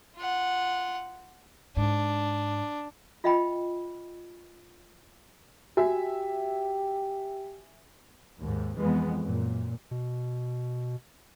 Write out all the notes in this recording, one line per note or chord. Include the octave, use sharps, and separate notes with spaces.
F4 F#5
G#2 D4
F4 D#5 E5 G5 B5
F#4 G4 E5 G#5
D#2 G#2
F2 E3 G#3 B3
F#2 A#2
B2